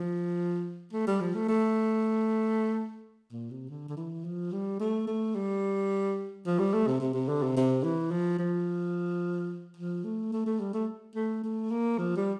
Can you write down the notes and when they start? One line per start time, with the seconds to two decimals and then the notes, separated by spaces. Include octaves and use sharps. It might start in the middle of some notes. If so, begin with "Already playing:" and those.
Already playing: F3
0.93 A3
1.07 G3
1.21 F3
1.35 A3
1.48 A3
3.32 A#2
3.51 C3
3.69 D3
3.89 D3
3.97 E3
4.25 F3
4.52 G3
4.80 A3
5.07 A3
5.35 G3
6.46 F3
6.59 G3
6.74 A3
6.87 C3
7.00 C3
7.14 C3
7.29 D3
7.43 C3
7.57 C3
7.84 E3
8.11 F3
8.39 F3
9.77 F3
10.04 A3
10.33 A3
10.46 A3
10.60 G3
10.74 A3
11.15 A3
11.43 A3
11.71 A#3
11.98 F3
12.17 G3